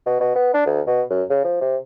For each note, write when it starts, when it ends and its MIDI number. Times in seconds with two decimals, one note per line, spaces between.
0.06 0.16 47
0.20 0.33 47
0.35 0.50 59
0.54 0.66 62
0.66 0.81 38
0.87 1.02 47
1.10 1.23 42
1.30 1.43 49
1.44 1.59 53
1.61 1.77 48